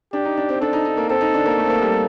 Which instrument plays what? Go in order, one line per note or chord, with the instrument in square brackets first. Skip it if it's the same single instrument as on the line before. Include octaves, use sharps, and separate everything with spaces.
[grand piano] D4 [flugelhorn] G4
[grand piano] D#4
D4
C4
[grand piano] D4 [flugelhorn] A4
[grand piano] D#4
D#4
A#3
[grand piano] C4 [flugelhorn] A4
[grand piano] D#4
D4
A#3
A3
C4
A#3
G3